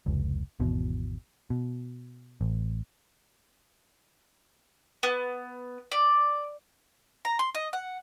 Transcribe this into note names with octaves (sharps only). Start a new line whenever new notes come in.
F1 C#2
G#1 E2 B2
B2
A1
B3
D5
A#5
C6
D#5
F#5